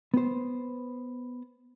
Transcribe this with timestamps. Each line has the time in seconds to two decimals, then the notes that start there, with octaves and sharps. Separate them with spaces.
0.14 B3 C5